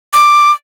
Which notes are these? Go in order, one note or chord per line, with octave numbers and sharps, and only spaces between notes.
D6